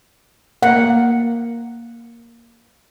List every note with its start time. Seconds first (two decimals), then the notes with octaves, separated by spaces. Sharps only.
0.63 A#3 F#5